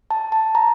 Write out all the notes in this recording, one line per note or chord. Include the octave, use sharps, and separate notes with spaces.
A5
A5
A#5